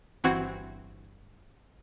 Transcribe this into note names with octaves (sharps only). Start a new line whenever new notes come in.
G1 E3 C4 F#4 F#5 G#6